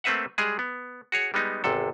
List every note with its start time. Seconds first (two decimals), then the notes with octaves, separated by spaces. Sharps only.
0.04 A3 A#3 C4 B4 E5 F#5
0.38 G3 G#3 G#4
0.59 B3
1.12 F#4 G#4 C#5
1.34 G3 G#3 B3 D#4
1.64 G#1 E2 C3 A4